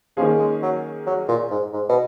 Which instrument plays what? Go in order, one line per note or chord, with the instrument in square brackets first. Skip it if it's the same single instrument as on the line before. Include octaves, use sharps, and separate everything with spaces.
[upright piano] D#3 A#3 C#4 G#4 [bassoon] F3
[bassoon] G#3
F#3
F#3
A#2
G#2
G#2
B2